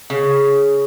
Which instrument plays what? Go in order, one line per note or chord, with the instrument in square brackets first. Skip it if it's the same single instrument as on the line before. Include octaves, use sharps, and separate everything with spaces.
[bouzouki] C#3